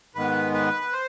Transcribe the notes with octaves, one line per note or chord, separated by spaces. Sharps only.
G#2 D#3 G#3 B3 B4
B4
C5